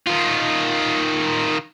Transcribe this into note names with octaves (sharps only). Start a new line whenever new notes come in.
D#3 F4